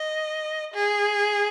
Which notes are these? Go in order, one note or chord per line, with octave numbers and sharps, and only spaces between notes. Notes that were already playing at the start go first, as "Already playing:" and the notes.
Already playing: D#5
G#4